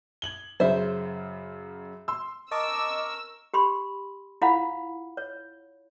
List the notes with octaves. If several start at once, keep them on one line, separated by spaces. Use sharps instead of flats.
G#6 F#7 G7
F#2 C#3 C5 E5
C6 E6
A#4 D#5 A5 C#6 D6 E6
G4 B5 C6
E4 F4 F5 F#5 B5
C#5